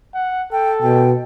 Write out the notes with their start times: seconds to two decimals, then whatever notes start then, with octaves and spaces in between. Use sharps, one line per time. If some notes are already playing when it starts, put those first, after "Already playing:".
0.15 F#5
0.52 A4 G5
0.82 B2 G5